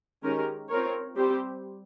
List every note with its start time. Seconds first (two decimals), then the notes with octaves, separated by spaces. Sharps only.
0.23 D#3 G#3 C#4 G4 A#4
0.69 C4 F4 A#4 C#5
1.16 G3 C4 G4 C5